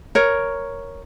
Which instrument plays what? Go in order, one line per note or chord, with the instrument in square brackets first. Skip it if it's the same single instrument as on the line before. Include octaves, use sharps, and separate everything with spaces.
[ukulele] A#4 C#5